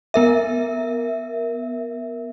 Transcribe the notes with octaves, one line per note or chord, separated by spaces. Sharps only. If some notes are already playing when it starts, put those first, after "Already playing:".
B3 A#4 E5